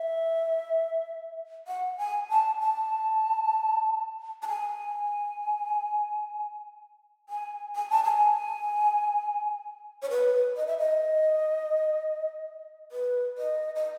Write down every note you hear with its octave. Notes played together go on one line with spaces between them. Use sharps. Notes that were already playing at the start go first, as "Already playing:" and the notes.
Already playing: E5
F#5
G#5
A5
A5
A5
G#5
G#5
G#5
A5
G#5
C#5
B4
D#5
E5
D#5
B4
D#5
D#5